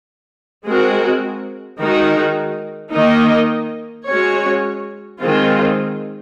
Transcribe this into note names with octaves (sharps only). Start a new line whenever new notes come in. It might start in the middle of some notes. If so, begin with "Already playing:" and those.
G#3 C4 F#4 A#4
D#3 G#3 D#4 F#4 A#4
D#3 A#3 D#4 A#4 D#5
G#3 C#4 F#4 C#5
D#3 G#3 C4 F4